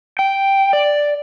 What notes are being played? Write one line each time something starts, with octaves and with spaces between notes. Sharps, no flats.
G5
D5